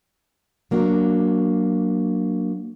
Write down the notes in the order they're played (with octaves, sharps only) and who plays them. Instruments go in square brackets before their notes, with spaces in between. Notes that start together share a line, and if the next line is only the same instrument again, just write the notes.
[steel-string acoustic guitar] F#3 A#3 D4 F#4